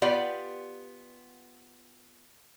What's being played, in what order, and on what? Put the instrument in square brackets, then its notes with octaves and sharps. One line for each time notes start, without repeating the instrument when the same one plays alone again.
[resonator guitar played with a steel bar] B3 F4 G4 D5 F#5